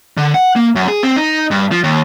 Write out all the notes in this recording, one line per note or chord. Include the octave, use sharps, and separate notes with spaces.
D3
F#5
A#3
F#2
G#4
C4
D#4
G2
F3
D#2